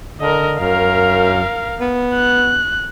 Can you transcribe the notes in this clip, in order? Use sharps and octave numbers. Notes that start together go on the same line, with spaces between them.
D3 A#4 D#5
F#2 A#4 F5
B3
F#6